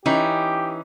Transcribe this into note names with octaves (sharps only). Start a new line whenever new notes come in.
E3 C#4 D#4 G4